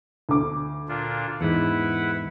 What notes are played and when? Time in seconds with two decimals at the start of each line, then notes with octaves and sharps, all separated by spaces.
0.29 D2 D6
0.89 A#2 D4 F4
1.41 E2 G#2 E4 B4 F#5